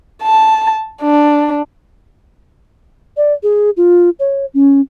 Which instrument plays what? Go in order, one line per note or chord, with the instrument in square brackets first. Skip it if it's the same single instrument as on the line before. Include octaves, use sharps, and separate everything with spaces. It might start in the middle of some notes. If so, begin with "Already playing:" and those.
[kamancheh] A5
D4
[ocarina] D5
G#4
F4
C#5
C#4